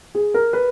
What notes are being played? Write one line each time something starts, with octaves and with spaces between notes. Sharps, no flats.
G#4
A#4
B4